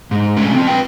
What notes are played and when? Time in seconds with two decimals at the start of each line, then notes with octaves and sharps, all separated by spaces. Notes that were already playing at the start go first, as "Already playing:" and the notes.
0.11 G#2
0.37 G#3 A3 C#4 F4
0.54 C4 F4
0.67 B4 G5